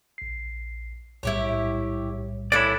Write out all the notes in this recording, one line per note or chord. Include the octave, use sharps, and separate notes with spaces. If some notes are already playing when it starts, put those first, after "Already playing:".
A#1 C7
B1 A2 G3 E4 G4 C#5
E3 D4 E4 A4 C#5 D5